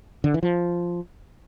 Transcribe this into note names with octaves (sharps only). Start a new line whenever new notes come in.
D3
E3
F3